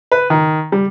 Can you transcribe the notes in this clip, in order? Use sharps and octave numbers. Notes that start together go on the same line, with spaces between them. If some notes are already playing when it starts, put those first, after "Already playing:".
B4
D#3
G3